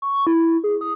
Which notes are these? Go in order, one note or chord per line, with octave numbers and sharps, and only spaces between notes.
C#6
E4
G#4
D#6